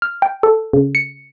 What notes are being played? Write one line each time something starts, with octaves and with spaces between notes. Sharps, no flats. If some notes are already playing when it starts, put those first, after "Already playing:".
F6
G5
A4
C#3
C#7